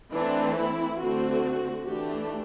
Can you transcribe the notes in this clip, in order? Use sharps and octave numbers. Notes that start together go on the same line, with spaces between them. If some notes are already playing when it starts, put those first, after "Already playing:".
E3 A3 C4 D4
E4
D3 A3 C4 F#4
E3 A3 D4 G4